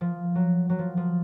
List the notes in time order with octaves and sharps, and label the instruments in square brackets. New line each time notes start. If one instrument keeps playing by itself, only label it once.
[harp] F3
F#3
F#3
F3
F3